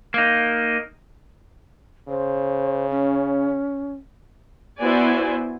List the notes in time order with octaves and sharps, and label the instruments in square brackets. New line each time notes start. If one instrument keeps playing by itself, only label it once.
[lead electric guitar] A#3 D#4
[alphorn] C#3 [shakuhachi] C5
[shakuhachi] C#4
[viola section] B3 E4 F#4 C5 D5 G#5